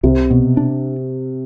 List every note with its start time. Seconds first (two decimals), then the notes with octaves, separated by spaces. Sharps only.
0.03 C2 C3
0.30 B2
0.57 D4